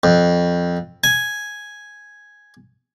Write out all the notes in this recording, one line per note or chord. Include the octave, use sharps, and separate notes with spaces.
F2
G#5